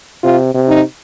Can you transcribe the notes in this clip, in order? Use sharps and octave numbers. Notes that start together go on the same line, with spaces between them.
C3 F4
C3
D#4